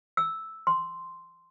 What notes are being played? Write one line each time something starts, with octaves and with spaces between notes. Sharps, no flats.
E6
C6